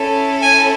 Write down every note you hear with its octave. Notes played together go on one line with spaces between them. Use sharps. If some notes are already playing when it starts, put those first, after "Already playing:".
Already playing: C#4 E4 A4
G#5